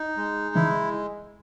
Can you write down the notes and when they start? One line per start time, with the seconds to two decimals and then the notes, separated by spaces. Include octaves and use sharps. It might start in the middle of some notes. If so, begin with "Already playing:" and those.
Already playing: D#4
0.17 G#3
0.55 C#3 E3 E4